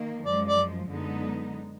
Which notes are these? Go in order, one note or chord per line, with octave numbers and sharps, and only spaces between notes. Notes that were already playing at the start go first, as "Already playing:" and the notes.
Already playing: D#3 A#3
F#2 F3 G#3 D5
D5
F#2 D3 G#3 B3 D#4